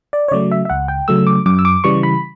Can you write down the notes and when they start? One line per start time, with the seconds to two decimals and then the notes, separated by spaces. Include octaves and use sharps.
0.13 D5
0.28 C#5
0.31 C#3 F#3 A3 D5
0.51 E5
0.65 E5
0.70 C#2 F#5
0.88 G5
1.08 C#3 F#3 A3 E6
1.27 D6
1.46 F#2 D6
1.59 E6
1.65 D6
1.84 C#3 E3 G3 C#6
2.03 B5